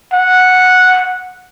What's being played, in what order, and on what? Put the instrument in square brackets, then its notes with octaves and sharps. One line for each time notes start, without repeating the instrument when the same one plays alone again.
[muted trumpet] F#5